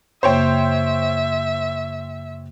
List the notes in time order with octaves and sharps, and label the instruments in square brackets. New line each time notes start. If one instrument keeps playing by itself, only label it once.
[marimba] F#2 C#3 A#3 [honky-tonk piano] C5 C#5 G5 [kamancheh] E5